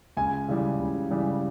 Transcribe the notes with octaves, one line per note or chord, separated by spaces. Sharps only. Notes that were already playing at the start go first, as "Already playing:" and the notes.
C#2 G#5
C#3 E3 G3
C#2
C#3 E3 G3